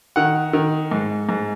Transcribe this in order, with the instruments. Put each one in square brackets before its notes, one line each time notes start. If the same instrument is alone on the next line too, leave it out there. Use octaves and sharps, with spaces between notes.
[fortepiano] D#3 F#5
D#3
G#2
G#2